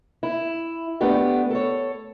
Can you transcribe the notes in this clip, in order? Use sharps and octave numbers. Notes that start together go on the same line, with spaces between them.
E4
A3 B3 D4 G4
A4 C#5